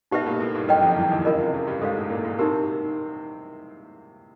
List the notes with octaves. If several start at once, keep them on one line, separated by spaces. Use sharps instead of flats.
B2 B3 D#4 G4 B4 E5
A3
A#2 A#3
A2 A3
G2 G3
F#2 F#3 B4 D#5 G5
F2 F3
E2 E3
D#2 D#3
C#3 F4 A#4 D#5
C3
C#3
G2 G3
G#2 G#3 A4 C#5 F5
A2 A3
A#2 A#3
A#2 A#3
C3 C4 D#4 G4 A#4